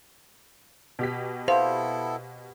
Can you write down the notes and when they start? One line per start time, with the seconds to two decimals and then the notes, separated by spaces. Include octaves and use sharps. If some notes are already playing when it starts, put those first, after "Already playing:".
0.99 B2 G4 B6
1.48 B3 E4 A4 C5 F5